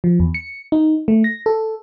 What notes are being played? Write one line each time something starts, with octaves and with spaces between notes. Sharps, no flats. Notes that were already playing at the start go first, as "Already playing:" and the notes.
F3
E2
C#7
D#4
A3
A#6
A4